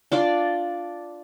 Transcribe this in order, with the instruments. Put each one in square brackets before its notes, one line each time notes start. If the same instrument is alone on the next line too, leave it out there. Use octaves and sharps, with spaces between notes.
[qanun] D4 F4 D5